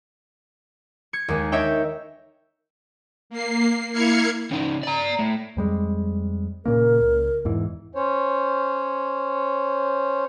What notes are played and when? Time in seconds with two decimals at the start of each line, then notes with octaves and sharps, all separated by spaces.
1.13 G#6 C#7
1.28 D#2 G#3
1.52 D#4 C#5 E5 G5
3.30 A#3 C7
3.92 A#3 E4 F6 G#6 C7 C#7
4.52 C#3 D#4
4.84 D5 A#5
5.19 A2
5.57 F2 G3 G#3
6.66 A#2 C#3 A#3 A#4
7.00 C#2
7.45 E2 G#2 E3
7.95 C#4 C5 C#5